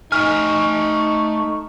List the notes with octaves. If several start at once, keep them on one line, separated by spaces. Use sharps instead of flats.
A3 D#4 E5 G#5 C#6 F6